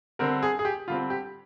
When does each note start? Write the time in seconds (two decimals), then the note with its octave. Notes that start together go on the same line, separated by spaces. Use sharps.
0.19 D3 G3 C4 A#4
0.43 G#4
0.59 G#4
0.65 G4
0.88 D3 G3 C4 F4
1.10 G4